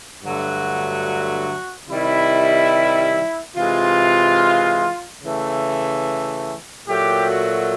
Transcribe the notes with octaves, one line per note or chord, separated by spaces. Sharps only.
G2 D3 F#3 A3 F#4
C3 D#3 G3 E4
C3 E3 G#3 F4
C#3 E3 A3
A#2 F#3 A3 G4
F#4